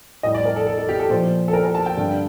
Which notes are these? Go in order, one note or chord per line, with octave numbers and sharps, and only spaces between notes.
A2 G3 D#5
D5
A#4
A4
A4
A4
G4
A4
A#2 F3 C5
A4
A#4
A#4
A5
G5
G2 D3 G3